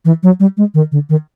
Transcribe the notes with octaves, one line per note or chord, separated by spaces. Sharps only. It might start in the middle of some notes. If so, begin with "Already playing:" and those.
E3
F#3
G3
G#3
D#3
D3
D#3